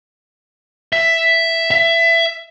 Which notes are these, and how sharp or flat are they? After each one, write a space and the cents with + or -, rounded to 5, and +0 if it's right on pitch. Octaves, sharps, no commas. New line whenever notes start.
E5 +5
E5 +20